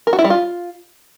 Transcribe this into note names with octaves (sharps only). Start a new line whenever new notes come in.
A#4
F#4
E4
G3
F4